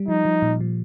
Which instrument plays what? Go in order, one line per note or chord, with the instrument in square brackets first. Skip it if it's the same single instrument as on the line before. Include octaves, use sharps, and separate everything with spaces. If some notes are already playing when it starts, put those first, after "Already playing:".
Already playing: [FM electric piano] G3
[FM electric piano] F3 [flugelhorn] D#4
[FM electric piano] F3
A#2
F3